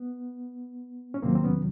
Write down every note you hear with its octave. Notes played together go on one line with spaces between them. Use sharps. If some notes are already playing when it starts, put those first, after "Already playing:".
Already playing: B3
C#4
E2 C3 D#3 F#3 A#3 C4
C4
B3 C#4